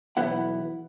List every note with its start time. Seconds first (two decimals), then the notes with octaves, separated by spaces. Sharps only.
0.17 B1 E2 B3 E4 F#5